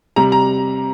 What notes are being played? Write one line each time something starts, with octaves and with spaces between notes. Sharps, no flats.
C3 G3 A#5
A#5